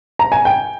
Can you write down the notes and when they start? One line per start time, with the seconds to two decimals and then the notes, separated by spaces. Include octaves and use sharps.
0.19 A#5
0.32 G#5
0.45 G5